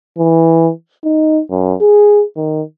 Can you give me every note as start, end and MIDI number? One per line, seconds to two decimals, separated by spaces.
0.18 0.71 52
1.04 1.41 63
1.51 1.75 42
1.81 2.24 68
2.37 2.62 51